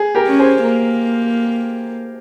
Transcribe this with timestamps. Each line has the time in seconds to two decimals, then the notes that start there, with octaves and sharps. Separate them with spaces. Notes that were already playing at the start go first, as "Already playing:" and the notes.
Already playing: G#4
0.15 G4 A#4
0.27 C#4
0.39 G#4 C5
0.63 A#3